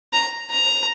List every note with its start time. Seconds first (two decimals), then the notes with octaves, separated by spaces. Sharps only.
0.13 A#5
0.51 A#5